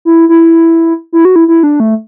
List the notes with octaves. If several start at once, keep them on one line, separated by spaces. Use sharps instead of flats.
E4
E4
E4
F#4
E4
E4
D4
A3